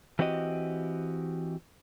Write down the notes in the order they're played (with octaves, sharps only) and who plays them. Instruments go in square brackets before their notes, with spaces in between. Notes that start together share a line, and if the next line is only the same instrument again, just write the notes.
[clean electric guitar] E3 C4 F#4 G4 D#5